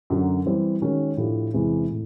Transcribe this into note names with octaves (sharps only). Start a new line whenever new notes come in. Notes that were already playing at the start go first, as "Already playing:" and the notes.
F#2 D3 F#3
E3 G3 C4
D#3 G#3 C#4 F#4
A2 F3 A3 D4 G4
E2 C3 E3 G#3
A2